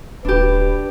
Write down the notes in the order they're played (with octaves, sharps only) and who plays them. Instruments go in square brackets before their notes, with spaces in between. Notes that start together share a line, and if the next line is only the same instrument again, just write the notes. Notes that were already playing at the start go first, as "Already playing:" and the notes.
[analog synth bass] D#1 [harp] D4 G4 [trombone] B4